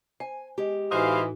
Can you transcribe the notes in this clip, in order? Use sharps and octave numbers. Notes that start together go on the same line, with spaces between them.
C5 G#5
G#3 G4
A2 E3 D#4 F#4 C5 D#5 F5